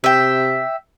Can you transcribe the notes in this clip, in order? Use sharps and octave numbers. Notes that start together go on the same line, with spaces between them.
C3 E5 G5